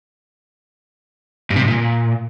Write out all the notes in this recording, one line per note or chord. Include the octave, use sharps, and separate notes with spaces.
G2
C3
G2
A#2